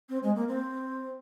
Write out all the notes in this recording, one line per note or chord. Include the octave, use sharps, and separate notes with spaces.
C4
G#3
A#3
C4